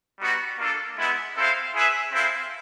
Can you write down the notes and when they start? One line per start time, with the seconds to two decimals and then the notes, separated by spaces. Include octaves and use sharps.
0.20 G3 B3 D#4 F#4
0.59 A#3 D4 F4 A4
0.98 G#3 B3 E4
1.36 C4 E4 A4 C5 F5
1.74 E4 G#4 B4 E5
2.12 C4 E4 A4 C5 F5